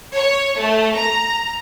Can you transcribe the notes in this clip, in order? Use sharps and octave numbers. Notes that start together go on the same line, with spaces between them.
C#5
A3
A#5